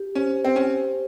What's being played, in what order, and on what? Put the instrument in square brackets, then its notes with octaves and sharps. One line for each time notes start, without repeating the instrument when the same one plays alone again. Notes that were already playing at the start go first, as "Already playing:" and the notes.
Already playing: [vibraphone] G4
[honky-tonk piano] C#4 [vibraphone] C5
[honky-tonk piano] C4
[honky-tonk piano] C#4 [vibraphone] C5